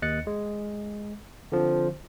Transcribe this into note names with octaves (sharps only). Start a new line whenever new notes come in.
D#2 D#5 F#6 A6 C#7
G#3
D3 F3 C4